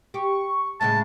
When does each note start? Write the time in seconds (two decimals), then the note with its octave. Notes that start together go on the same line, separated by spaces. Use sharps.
0.14 G4 C#6
0.81 A2 C#3 G#3 A5